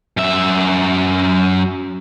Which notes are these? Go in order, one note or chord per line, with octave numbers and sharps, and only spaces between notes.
F#2 E5